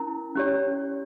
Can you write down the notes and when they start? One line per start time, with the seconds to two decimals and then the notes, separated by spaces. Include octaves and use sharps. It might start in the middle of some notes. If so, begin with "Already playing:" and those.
Already playing: C#4 E4 A#4 A#5
0.36 C#4 G4 C#5